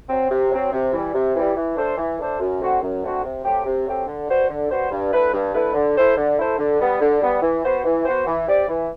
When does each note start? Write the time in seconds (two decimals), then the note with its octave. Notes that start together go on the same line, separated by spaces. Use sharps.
0.09 F#3 C4
0.30 C3
0.51 F#3 C4
0.73 C3
0.92 E3 G3
1.14 C3
1.35 E3 G3
1.56 E3
1.77 A3 D4 A4 C5
1.97 E3
2.18 A3 D4 A4 C5
2.40 F#2
2.61 D3 A3 C4 F#4
2.82 F#2
3.03 D3 A3 C4 F#4
3.24 C3
3.44 F#3 A3 C4 G4
3.66 C3
3.86 F#3 A3 C4 G4
4.07 D3
4.28 G3 B3 F#4 C5
4.49 D3
4.70 G3 B3 F#4 C5
4.91 G2
5.12 D3 A3 E4 B4
5.34 G2
5.54 D3 A3 E4 B4
5.74 D3
5.97 A3 E4 A4 C5
6.17 D3
6.38 A3 E4 A4 C5
6.59 D3
6.80 G3 B3
7.01 D3
7.22 G3 B3
7.42 E3
7.63 B3 F#4 C5
7.84 E3
8.05 B3 F#4 C5
8.27 E3
8.48 G3 C4 G4 D5
8.68 E3